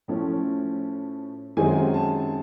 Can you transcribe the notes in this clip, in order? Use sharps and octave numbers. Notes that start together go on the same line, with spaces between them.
A2 F3 A3 C#4
F#2 D#3 G#3 C4 G#5
A5